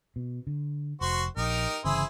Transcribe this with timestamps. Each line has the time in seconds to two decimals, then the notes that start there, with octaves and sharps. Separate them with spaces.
0.16 B2
0.47 D3
1.01 F1 F#4 C5 C#6
1.37 A#1 D#4 G4 A#4
1.84 G1 C#3 E3 E4 G#4 C5